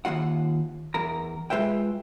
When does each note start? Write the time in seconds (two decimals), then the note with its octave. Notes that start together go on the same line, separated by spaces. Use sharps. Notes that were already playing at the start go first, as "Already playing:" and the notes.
0.05 D#2 F3 F4 F#5
0.94 E2 A#4 A#5
1.50 G#3 F4 B4 E5 G5